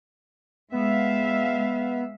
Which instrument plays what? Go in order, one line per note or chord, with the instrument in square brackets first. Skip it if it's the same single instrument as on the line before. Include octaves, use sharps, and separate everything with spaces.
[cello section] G#3 E5 F5 [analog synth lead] B3